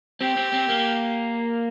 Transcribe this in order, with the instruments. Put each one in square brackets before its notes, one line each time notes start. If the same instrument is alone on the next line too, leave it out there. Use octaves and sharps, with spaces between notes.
[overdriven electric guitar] C4 [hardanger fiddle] G4
[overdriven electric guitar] C4
C4
A#3